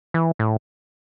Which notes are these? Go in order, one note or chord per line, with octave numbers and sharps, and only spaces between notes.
E3
A2